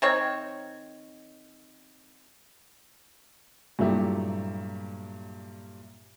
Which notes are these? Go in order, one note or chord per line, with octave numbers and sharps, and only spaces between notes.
D#3 C4 C#5
G2 A#2 F#3 A3 E4 G4